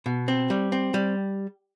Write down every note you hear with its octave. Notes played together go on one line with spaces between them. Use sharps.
B2
C4
G3
C4
G3